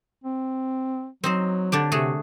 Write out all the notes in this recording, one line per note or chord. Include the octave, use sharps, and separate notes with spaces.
C4
F#3 C4 D#4 C5
D3 D4 G4
C3 A3 F#4 G#4